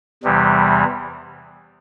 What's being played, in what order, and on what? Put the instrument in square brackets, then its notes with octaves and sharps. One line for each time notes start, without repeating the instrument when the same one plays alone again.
[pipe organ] E2 C3 E3 G3